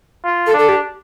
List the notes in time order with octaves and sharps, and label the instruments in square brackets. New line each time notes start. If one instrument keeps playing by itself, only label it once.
[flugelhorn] F4
[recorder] A4
[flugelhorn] D4
[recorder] A4
G4